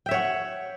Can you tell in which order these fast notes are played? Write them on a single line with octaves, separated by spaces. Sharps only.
G5 E5 C#5 F#5